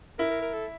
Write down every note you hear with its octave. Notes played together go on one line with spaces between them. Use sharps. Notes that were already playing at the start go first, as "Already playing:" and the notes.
E4 A#4
A#4
A#4
A4